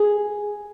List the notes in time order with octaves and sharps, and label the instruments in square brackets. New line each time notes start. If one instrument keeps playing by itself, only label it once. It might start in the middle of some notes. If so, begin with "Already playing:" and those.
Already playing: [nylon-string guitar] G#4